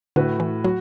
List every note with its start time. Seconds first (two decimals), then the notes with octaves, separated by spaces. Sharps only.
0.16 A2 D3 A3 F#4 B4
0.40 E3
0.64 F#3 F#4